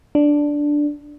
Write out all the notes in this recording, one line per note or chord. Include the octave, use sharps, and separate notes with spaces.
D4